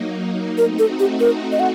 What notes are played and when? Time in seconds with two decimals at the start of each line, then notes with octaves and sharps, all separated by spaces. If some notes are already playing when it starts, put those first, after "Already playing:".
Already playing: F#3 A#3 D#4
0.58 A3 C4 D#4 F#4 A#4
0.79 A4
1.00 G4
1.20 A#4
1.52 D#5
1.60 F#5